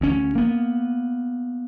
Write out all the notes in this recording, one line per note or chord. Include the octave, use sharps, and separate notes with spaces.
D2 C#4
A#3 B3